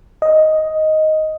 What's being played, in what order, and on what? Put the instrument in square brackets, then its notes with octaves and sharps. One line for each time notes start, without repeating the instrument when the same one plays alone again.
[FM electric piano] D#5